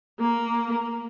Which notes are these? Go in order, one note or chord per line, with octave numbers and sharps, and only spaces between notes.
A#3